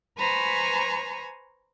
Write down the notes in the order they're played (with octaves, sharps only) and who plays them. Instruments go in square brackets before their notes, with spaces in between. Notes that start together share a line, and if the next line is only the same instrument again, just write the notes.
[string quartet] B4 C5 G#5 A#5 B5 C#6